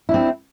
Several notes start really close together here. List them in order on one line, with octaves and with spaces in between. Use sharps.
E4 D4 C4